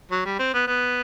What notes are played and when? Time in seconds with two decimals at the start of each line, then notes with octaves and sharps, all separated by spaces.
0.11 F#3
0.25 G3
0.39 C4
0.53 B3
0.67 B3